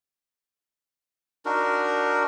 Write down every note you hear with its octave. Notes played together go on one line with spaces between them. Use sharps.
D4 D#4 F#4 A#4